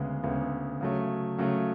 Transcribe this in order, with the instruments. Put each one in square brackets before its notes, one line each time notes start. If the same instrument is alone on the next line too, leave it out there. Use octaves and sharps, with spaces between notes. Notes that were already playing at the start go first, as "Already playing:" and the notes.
Already playing: [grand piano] D2 C#3 G#3 B3
D2 C#3 G#3 B3
C#3 F#3 A3
C#3 F#3 A3